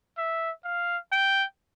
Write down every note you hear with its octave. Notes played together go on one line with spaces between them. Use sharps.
E5
F5
G5